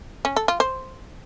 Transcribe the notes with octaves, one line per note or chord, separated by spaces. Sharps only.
C#4
A4
F4
C5